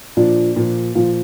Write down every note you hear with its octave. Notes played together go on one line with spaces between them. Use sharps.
A#2 F3 D4
A#2 F3
A#2 F3 F4